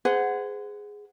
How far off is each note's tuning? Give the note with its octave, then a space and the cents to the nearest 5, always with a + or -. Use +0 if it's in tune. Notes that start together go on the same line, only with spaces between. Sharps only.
G#4 +0 C5 -35 F#5 +0